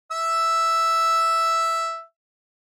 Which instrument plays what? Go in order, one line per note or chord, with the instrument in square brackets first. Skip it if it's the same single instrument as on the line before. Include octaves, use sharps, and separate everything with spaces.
[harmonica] E5 E6